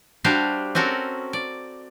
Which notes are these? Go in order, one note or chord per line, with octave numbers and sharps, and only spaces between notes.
G3 D4 F#4 G4 C5 F5
C4 C#4 F#4 A4 A#4
D5